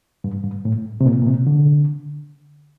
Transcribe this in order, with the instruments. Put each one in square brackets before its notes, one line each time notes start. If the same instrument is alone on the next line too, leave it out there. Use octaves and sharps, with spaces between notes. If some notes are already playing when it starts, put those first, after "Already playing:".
[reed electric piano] G2
G2
A2
C3
A#2
A#2
C3
D3